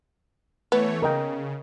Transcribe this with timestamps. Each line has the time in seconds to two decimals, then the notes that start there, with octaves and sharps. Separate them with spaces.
0.72 E3 A3 B3 C#5
1.02 C#3 A#4 D#5 G5